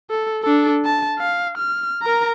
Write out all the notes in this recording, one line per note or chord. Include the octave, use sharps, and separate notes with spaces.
A4
D4 A4
A5
F5
F6
A#4 A#5